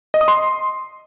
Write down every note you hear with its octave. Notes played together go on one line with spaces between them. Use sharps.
D#5
D#6
C6